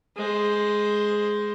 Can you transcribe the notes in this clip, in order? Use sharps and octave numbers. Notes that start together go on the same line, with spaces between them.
G#3 C5